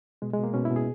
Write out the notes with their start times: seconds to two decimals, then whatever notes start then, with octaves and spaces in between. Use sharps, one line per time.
0.22 B2 G#3
0.33 G#3
0.39 B2 A#3
0.54 B2 C#4
0.65 E4
0.71 B2
0.76 G#4